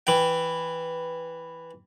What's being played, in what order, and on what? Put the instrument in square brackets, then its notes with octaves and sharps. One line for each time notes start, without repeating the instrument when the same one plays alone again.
[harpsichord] E3 G5